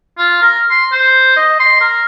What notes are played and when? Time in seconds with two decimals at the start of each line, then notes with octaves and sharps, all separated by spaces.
0.18 F4
0.42 A#4
0.70 C6
0.92 C5
1.36 D#5
1.60 C6
1.81 A#4